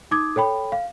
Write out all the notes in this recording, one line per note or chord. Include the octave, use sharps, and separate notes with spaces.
D#4 D6 D#6 G#6
A4 C#5 G5 B5
F5